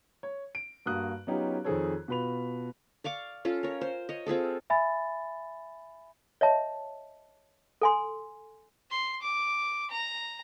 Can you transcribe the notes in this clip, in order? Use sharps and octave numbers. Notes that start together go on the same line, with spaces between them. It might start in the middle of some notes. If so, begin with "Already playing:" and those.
C#5
D7
G2 A#3 F#4 D#6 F#6
F#3 B3 C#4 D#4 F4 G4
F2 D#3 C4 G#4 A4 C#5
B2 F4 B4 B5 F7
D5 F5 C#6 D6
C#4 F4 A4
A#4 C#5
C5
C#5 D#5
C4 F4 G#4 A4
E5 G#5 B5 A6
C#5 D#5 E5 A5
A4 G#5 C6
C6
D6
A#5